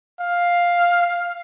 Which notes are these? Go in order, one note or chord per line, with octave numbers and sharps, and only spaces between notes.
F5